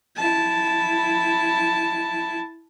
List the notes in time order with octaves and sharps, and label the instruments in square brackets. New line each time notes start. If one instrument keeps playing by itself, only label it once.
[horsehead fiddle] E4 A5